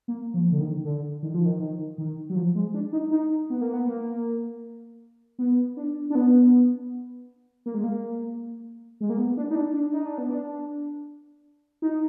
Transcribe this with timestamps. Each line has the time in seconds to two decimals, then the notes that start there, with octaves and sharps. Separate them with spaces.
0.08 A#3
0.34 F3
0.52 D3
0.60 D#3
0.84 D3
1.23 D#3
1.34 F3
1.45 D#3
1.60 D#3
1.98 D#3
2.29 F#3
2.36 F3
2.55 G#3
2.74 D4
2.93 D#4
3.11 D#4
3.50 B3
3.61 A#3
3.73 B3
3.87 A#3
5.39 B3
5.77 D4
6.10 D4
6.15 B3
7.66 A#3
7.74 G#3
7.84 A#3
9.01 G#3
9.10 A#3
9.17 B3
9.37 D4
9.51 D#4
9.55 D4
9.74 D4
9.93 D#4
10.05 D4
10.18 B3
10.30 D4
11.82 D#4